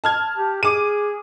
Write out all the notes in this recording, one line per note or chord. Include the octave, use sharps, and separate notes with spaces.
A5 F6 G#6
G4
G#4 D6 D#7